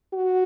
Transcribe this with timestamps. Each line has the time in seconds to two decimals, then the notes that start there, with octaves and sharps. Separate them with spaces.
0.13 F#4